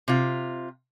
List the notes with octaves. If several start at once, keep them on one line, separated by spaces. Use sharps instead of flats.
C3 F4